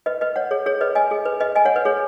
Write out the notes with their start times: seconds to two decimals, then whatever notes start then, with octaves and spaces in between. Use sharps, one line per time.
0.06 B4 D#5
0.21 B4 D#5
0.36 C#5 F#5
0.51 G#4 C#5
0.66 G#4 C#5
0.81 B4 D#5
0.95 D#5 G#5
1.11 G#4
1.25 B4
1.40 B4 D#5
1.55 D#5 G#5
1.65 C#5 F#5
1.76 B4
1.85 G#4 C#5